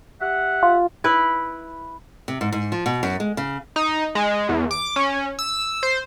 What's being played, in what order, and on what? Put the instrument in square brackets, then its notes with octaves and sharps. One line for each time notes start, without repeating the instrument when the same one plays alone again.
[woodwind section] G4 E5 F#5
[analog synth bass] F4
[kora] E4 B4
[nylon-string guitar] C3
G#2
G#2
F3
B2
F#2
G#3
C#3
[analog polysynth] D#4
G#3
E2
D6
C#4
E6
C5